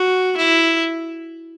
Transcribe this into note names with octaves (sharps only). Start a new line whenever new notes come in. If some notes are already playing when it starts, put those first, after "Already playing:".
Already playing: F#4
E4